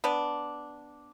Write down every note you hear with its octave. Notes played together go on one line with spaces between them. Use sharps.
B3 D4